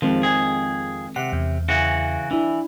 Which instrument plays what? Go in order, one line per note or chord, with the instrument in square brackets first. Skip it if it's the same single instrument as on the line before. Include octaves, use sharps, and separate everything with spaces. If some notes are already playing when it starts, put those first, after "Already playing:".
[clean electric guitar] F2 F3 [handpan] D#3 G#3 C4
[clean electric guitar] F2 G#4
[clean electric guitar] C3 [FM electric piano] F#5
[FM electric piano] E2
[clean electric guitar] C#3 E3 F#4
[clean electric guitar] E3 [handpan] D4 E4